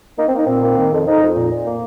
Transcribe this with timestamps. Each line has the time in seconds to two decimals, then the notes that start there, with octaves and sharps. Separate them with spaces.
0.18 A#3 D#4
0.28 C4
0.33 A#3 D#4
0.47 A#2 C4
0.62 A#3
0.77 D#3
0.92 F2
1.06 F2 D#4
1.21 F2
1.35 A#2
1.51 A#2
1.65 A#3